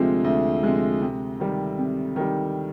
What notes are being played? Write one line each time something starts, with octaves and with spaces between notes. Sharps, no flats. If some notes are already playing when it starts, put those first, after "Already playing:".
Already playing: D2 C3 F3 G#3
D2
C3 F3 G#3
C3
D#3 G3
C3
D#3 G3